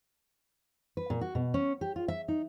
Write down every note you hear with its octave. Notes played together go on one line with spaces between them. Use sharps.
B4
A#2
F#4
B2
C#4
G4
F4
E5
D#4